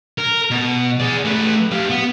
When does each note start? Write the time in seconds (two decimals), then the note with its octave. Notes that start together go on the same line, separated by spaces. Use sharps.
0.18 A#4
0.51 B2
1.00 G#4 D5
1.25 A3 B4
1.72 G4 F5
1.90 B3